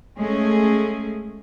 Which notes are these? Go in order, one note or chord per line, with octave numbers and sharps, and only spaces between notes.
G#3 A3 C#4 G#4